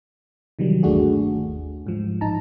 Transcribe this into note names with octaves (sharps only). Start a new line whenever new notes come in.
C3 D#3 E3 F#3 G3
G1 D#2 A3 D4 F#4 G#4
G#2 F3
A1 D#4 A5 A#5